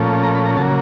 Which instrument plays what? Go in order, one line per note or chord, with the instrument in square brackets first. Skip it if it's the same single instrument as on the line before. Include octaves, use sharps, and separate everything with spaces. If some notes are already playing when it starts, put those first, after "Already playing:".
Already playing: [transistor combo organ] A#2 F3 A3 C#4
A#5
B5
A#5
C#3 F#3 A#3 A5